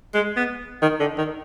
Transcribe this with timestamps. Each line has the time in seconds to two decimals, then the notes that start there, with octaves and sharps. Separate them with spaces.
0.14 G#3
0.36 B3
0.82 D#3
1.00 D3
1.18 D#3